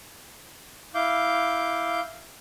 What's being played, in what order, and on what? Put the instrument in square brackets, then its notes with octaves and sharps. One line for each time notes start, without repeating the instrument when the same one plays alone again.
[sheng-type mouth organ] E4 F5 D6 G6